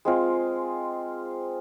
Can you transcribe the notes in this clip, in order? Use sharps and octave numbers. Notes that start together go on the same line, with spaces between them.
G#3 C4 F4